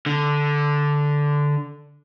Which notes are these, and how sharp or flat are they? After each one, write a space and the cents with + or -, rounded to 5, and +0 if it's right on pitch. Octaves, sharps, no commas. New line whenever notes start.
D3 -5